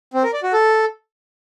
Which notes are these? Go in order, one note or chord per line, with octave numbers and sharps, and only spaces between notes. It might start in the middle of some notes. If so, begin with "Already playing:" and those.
C4
A#4
D5
F#4
A4